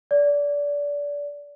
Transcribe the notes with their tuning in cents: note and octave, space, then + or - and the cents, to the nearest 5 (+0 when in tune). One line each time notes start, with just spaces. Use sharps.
D5 -25